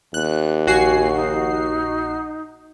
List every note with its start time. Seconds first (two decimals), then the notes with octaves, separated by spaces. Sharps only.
0.14 D#2 F#6
0.67 A#1 F#4 G#5 C7
1.15 D#4